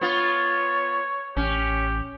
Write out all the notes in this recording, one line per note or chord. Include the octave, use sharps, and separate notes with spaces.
B3 F4 C#5
A1 C#4 G4